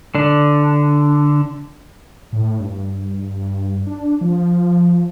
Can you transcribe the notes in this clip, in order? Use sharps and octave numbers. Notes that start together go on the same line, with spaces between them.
D3 D4
A2
G2
D4
F3